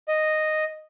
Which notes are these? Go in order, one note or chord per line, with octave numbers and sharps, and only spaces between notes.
D#5